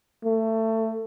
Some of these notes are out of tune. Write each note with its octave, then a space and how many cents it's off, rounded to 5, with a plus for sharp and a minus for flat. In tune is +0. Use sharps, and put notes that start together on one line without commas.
A3 +20